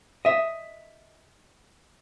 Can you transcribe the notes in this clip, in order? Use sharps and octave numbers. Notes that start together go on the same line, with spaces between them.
D#5 E5